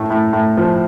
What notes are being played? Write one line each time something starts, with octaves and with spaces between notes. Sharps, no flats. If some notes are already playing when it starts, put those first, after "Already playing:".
Already playing: A2 A3
A2
A2
F3